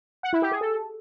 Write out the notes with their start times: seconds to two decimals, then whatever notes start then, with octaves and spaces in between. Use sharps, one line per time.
0.23 F#5
0.33 E4
0.42 G4
0.51 G#4
0.61 A4